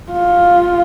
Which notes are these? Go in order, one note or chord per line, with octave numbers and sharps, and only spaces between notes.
F4